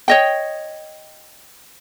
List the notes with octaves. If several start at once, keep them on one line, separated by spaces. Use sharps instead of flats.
C#5 D#5 G5